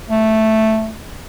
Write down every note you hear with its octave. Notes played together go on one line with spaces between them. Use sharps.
A3